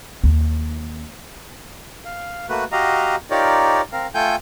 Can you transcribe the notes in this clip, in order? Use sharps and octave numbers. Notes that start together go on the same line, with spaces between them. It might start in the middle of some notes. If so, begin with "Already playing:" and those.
D#2
F5
A3 A#3 F#4 B4
F#4 G4 D#5 F5 A#5
D#4 F4 G4 A#4 C#5 D5
C4 A#4 F5
A3 F4 A4 G5 G#5 G6